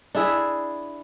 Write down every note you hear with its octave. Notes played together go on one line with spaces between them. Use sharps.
D4 E4 G#4 E5